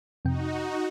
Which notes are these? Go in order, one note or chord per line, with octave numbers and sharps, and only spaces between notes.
F2 C3 D#4 F#4 G5